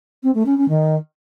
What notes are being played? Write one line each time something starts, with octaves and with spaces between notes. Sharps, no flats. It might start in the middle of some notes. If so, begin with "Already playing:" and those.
C4
A3
C#4
C#4
D#3